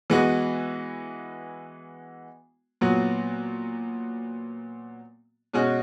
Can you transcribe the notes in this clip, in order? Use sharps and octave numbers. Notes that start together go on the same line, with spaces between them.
E3 G#3 B3 F#4
A#2 F#3 B3 F#4
B2 G#3 C#4 F#4